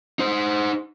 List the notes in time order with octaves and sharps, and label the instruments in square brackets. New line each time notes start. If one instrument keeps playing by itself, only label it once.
[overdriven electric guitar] D#4 C5